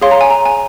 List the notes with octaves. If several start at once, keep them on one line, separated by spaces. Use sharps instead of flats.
G#4 C#5 F5 C6
A#5
G#5
A#5
G#5